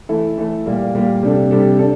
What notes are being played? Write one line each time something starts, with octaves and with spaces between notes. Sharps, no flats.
E3 A3 E4 A4
E3 A3 E4 A4
A#2 G3 A#3
A#2 G3 A#3
C3 G3 D4 A4
C3 G3 D4 A4
D4 A4